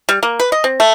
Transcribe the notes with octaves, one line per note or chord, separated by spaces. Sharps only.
G3
A#3
B4
D#5
C4
A3